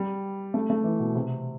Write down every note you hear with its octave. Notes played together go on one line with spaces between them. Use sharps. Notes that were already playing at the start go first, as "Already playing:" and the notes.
Already playing: G3
A3
A3
E3
B2
C3